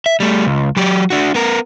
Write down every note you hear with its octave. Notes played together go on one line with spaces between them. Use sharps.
E5
G3 A3
C#2
F#3 G4
D4 F#4
B3 A#4